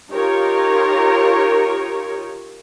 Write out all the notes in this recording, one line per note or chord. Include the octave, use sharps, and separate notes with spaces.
D#4 F4 G4 A#4 C#5